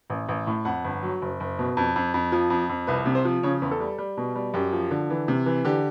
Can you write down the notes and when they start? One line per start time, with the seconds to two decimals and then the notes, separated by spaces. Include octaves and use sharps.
0.10 A1
0.28 A1
0.47 A2
0.65 F2 F#5
0.84 G1
1.03 F#3
1.22 F#1
1.40 F#1
1.59 B2
1.77 F2
1.96 F2
2.14 F2
2.32 F3
2.50 F2
2.69 F2
2.87 C2 B4
3.06 C3
3.15 C5
3.25 F3
3.43 C#3 C#5
3.62 E2
3.71 A4
3.80 G3
3.98 G3
4.17 B2
4.36 G3
4.54 F#2 G4
4.73 F3
4.91 D3
5.10 E3
5.28 C3
5.46 E3
5.65 D3 G4